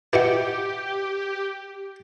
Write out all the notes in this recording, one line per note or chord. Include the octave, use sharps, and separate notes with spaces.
E4 F#4 G4 B4 D#5 F#5 C#6